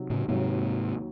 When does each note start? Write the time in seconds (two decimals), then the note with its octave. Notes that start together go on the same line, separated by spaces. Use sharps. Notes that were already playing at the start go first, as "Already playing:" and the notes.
Already playing: C3 D#3 F#3
0.10 A2 C#3
0.28 D#2 G#2 C3 D#3 F#3